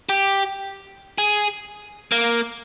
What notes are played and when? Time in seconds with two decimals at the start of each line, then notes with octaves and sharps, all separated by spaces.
0.09 G4
1.18 G#4
2.12 A#3